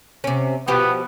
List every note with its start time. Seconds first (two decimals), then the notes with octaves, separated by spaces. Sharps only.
0.24 C3 C#4
0.68 B2 F3 B3 G4